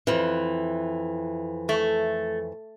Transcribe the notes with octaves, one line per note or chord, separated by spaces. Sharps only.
F2 E3
A3